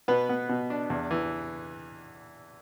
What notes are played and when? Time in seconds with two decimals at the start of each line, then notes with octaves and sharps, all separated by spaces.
0.08 B2 B3 B4
0.29 B3
0.49 B2
0.70 D4
0.90 E2
1.11 E3